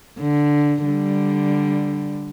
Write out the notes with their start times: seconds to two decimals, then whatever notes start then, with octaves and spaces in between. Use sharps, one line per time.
0.20 D3
0.85 D3 G3